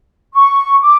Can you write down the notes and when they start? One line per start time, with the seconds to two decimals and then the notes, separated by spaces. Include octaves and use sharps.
0.34 C#6
0.82 D6